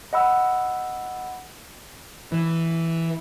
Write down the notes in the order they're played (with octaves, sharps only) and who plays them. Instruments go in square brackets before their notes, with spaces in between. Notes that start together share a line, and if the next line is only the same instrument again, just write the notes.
[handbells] D#5 F#5 B5 E6
[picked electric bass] E3